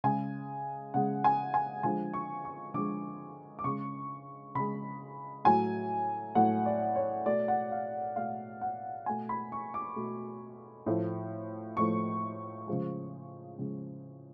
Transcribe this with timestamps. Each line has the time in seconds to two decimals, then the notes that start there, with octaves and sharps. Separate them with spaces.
0.04 C#3 G#3 G#5
0.94 C#3 G#3 F#5
1.24 G#5
1.54 G#5
1.83 D3 F3 G#3 G#5
2.14 C#6
2.45 C#6
2.74 D3 F3 G#3 D6
3.59 D6
3.64 C#3 G#3 C#6
4.55 C#3 G#3 B5
5.45 A2 F#3 A3 G#5
6.35 A2 F#3 A3 F#5
6.66 D5
6.96 C#5
7.25 B2 A3 D5
7.48 F#5
7.71 F5
8.16 B2 A3 F5
8.61 F#5
9.06 B2 A3 G#5
9.29 B5
9.52 C#6
9.74 D6
9.96 B2 A3
10.86 A2 F3 A3
11.77 A2 F3 A3 C#6
12.67 C#3 F3 G#3
13.59 C#3 F3 G#3